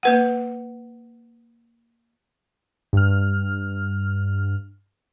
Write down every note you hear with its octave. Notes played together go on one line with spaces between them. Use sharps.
A#3 B4 F#5
G2 F6